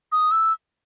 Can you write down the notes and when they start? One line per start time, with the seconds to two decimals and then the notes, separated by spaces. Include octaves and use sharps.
0.12 D#6
0.31 E6